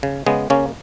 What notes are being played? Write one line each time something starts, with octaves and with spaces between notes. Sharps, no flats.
C#3
C#3 G#3 B3
C#3 A#3 C#4